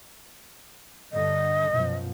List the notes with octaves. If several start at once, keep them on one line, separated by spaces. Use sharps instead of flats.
G2 D3 D#5
F#2 B2 F3